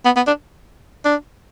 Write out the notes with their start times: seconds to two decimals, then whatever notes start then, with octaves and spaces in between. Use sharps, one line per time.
0.05 B3
0.16 B3
0.27 D4
1.05 D4